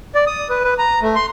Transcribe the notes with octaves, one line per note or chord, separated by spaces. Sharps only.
D5
D#6
B4
B4
A#5
A3
C6